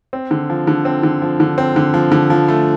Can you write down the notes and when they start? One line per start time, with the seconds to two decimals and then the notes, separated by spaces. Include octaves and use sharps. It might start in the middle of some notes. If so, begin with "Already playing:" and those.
0.13 C4
0.31 D3
0.50 F3
0.67 D3
0.85 C4
1.03 D3
1.22 F3
1.40 D3
1.58 C4
1.76 D3
1.94 F3
2.12 D3
2.30 F3
2.48 A3